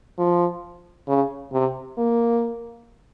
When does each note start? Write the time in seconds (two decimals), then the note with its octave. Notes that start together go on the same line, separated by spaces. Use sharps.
0.19 F3
1.08 C#3
1.53 C3
1.98 A#3